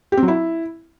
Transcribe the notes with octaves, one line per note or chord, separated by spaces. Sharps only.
G4
C4
F#3
E4